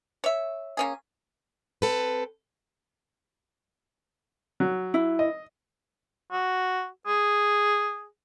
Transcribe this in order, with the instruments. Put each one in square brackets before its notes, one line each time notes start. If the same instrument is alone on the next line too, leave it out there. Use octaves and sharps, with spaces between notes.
[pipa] C#5 E5
A#3 C#4 G#4
[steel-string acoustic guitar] C4 A4 B4
[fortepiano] F#3
[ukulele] E4
[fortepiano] D#5
[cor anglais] F#4
G#4